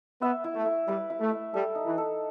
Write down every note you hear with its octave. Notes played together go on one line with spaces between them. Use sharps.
B3 E5
E4
A3
E4
G3 B4
E4
A3
E5
G3 A4
D#4
E3
A4